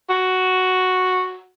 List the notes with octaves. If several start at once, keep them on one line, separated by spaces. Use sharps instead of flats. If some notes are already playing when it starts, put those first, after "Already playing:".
F#4